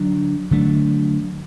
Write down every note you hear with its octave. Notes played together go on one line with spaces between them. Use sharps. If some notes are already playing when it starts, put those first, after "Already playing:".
Already playing: D3 F#3 D4
D3 F#3 A3 D4